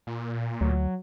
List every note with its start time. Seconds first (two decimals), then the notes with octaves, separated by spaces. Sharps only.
0.07 A#2
0.61 D2 F#3